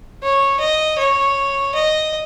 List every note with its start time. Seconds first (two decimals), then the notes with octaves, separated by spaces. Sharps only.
0.23 C#5
0.60 D#5
0.98 C#5
1.75 D#5